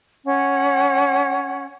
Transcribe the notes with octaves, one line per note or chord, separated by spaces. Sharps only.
C#4 F#5